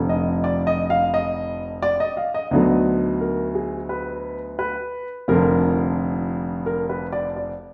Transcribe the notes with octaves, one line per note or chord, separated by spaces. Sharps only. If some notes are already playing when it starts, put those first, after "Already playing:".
Already playing: F1 F2 D3
D#5
D5
D#5
F5
D#5
D5
D#5
F5
D#5
D2 D3 F#3 B3 D#4 D5
A#4
G#4
B4
B4
F1 F2 D3 A#4
A#4
B4
D5
D5